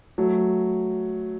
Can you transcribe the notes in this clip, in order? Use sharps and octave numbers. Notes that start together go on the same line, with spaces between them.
F#3 A3